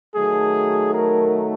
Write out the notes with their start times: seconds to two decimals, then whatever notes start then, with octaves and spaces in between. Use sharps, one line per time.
0.15 D#3 F#3 A3 G#4
0.94 A#4